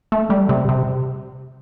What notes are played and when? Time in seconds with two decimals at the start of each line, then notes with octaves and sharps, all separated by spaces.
0.12 A3
0.30 G3
0.49 C3
0.69 C3